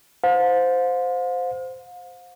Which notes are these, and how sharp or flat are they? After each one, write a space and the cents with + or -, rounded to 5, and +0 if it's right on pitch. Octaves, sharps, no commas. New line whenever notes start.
C5 -10 F5 +40